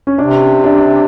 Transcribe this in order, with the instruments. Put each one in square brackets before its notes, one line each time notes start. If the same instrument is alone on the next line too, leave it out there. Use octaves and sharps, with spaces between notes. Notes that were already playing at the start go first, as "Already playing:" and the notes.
[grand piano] C#4
[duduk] C3 [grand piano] D4
[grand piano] D4